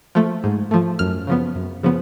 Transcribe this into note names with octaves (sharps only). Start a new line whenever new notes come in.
F3 A3
G#2
F3 A3
F#2 F6
C#3 F3 B3
F#2
C#3 F3 B3